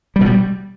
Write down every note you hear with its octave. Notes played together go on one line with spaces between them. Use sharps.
G3
B2
G3